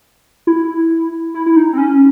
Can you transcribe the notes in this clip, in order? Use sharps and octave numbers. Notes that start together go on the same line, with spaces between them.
E4
E4
E4
D#4
C4
C#4